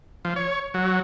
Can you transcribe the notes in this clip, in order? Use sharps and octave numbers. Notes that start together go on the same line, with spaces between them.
F3
C#5
F#3